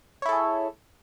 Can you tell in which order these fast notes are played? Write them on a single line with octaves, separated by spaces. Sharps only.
C#5 E4 A4 G#4